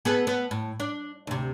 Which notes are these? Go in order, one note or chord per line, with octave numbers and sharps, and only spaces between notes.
B3 G#4 A4
B3
A2
D4
D2 C3